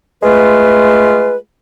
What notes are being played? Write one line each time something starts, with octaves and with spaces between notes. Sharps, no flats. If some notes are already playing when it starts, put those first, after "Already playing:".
G#3 A3 F4 B4